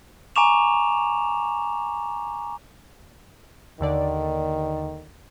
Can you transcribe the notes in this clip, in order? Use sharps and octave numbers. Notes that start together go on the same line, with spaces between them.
G#5 A#5 C#6 D6 E7 F7
D#2 D3 D#3 D5